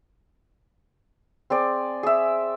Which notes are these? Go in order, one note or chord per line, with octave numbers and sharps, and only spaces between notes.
C4 G#4 D5
G#4 E5